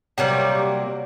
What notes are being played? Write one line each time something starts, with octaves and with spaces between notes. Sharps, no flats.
C3 F#3 G3 A#3